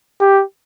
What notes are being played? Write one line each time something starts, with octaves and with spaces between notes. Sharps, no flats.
G4